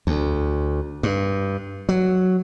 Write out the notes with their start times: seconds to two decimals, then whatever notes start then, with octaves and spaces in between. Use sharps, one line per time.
0.07 D2
1.03 G2
1.89 F#3